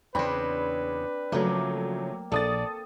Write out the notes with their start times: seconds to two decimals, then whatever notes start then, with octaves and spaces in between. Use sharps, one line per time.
0.15 E2 C#3 C4 D4 B4 B5
1.32 C#3 F3 F#3 A3 A#3
2.32 A#1 A4 D5 D#6 A6